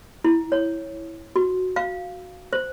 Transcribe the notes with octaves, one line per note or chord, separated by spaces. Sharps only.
E4
C#5
F#4
F5
C5